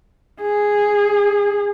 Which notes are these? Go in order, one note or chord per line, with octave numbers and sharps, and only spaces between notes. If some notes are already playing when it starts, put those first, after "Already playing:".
G#4